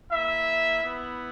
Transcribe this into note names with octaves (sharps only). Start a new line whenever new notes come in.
A#3 E4 E5
B3 E4